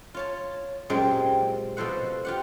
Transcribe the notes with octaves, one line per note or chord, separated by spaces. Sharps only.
F4 C#5 A5
F#2 A#2 G#3 C4 G4
B2 F3 A4 C5 F#5
F4 G4 F#5